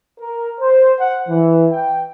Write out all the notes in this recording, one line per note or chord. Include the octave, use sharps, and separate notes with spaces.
A#4
C5
F#5
E3
G5